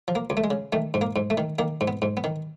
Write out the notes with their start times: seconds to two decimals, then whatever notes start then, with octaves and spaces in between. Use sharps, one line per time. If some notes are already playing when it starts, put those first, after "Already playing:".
0.08 F3
0.15 A#3
0.30 C#2
0.37 A3
0.44 G#3
0.50 C#3
0.73 D#3 A3
0.94 G#2
1.01 A#3
1.16 G#2
1.30 A3
1.37 D#3
1.59 D#3 A#3
1.81 G#2
1.88 B3
2.02 G#2
2.17 B3
2.24 D#3